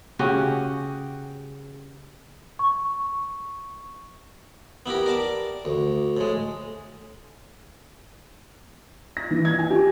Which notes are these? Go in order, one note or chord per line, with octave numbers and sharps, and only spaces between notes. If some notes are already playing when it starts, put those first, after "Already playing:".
C#3 C#4 F#4 G4
C#6
B3 E4 G4 A#4
A#4 D5 A5
D2
A2 G#3
A#6
E3
G#6
G#5
G4